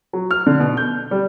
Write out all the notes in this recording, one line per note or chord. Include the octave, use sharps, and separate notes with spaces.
F#3
F6
D3
B2
G6
G3